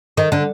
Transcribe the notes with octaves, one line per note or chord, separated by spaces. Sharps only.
D#3
D3